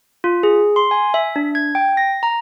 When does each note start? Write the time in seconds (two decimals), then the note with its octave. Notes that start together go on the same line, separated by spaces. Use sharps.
0.24 F4
0.43 G#4
0.76 C6
0.91 G#5
1.14 E5
1.36 D4
1.55 G#6
1.75 G5
1.97 A#6
2.23 A#5